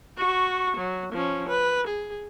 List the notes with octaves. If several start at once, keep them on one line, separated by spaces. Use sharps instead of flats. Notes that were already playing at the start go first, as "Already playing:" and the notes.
F#4 C#6
F#3
F3 C#4
B4
G#4